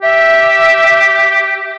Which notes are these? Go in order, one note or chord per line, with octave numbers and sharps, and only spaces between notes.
G4 E5